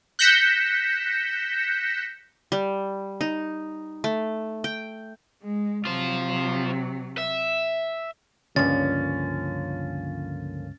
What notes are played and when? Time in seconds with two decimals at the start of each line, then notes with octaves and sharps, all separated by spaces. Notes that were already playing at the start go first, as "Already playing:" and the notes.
0.19 F#6 G6 A#6 B6 C#7 E7
2.52 G3
3.21 D#4
4.04 A3
4.64 G5
5.43 G#3
5.85 C3 F#3 F4 C5
7.18 E5
8.56 C#2 G2 D3 F3 A#3 C#4 A6